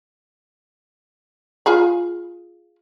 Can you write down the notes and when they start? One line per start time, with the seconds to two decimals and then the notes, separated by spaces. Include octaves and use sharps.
1.66 F4 G#4 B5